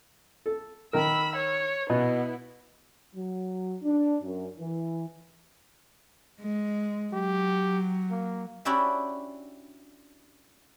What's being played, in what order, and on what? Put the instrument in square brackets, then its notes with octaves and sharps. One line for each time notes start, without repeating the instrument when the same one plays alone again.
[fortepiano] A4
[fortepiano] D#3 A#4 [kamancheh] B5 E6
[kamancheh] C#5
[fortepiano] B2 [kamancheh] B3 E4
[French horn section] F#3
D4
F#2
E3
[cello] G#3
[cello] F#3 [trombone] G4
[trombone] A#3
[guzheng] C#4 D4 E4 F#4 G4 E5